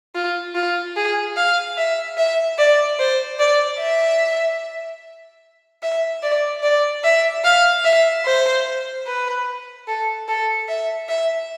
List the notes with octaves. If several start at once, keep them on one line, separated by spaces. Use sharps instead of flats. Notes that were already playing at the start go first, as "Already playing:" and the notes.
F4
F4
G#4
F5
E5
E5
D5
C5
D5
E5
E5
D5
D5
E5
F5
E5
C5
B4
A4
A4
E5
E5